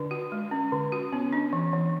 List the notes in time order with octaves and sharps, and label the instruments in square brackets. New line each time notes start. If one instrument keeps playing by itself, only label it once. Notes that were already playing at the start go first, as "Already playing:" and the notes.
Already playing: [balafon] D3 [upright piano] D4
[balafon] F#4
G#3
C#4
D3
F#4
[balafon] B3 [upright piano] C#4
[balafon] D4
E3
E3